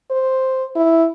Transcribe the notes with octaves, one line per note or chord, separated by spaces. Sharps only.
C5
E4